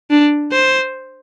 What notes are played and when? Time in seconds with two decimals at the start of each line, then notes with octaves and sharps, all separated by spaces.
0.11 D4
0.52 C5